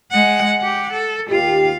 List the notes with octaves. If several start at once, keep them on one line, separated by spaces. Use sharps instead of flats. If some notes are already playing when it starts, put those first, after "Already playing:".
G#3 F#5
G4 F#5
A4
D#2 F4 G4 F5